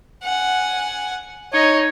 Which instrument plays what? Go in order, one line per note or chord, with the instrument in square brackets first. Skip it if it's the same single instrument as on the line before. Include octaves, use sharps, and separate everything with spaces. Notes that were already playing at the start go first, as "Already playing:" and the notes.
[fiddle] F#5 G#5
[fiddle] D#4 D#5 [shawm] C#5